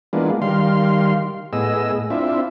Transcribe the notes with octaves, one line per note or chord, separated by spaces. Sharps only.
E3 G#3 A#3 B3 D4 F4
D#3 G3 F5 C6
A2 B3 G#4 D#5 E6
C4 D4 E4 F4 E5